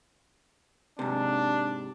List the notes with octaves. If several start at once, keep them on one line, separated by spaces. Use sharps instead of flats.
G#2 C3 D4